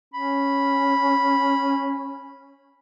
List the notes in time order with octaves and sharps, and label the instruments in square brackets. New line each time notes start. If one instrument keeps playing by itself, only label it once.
[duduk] C#4 [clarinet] B5